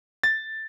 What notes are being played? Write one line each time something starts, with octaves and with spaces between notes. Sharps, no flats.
A6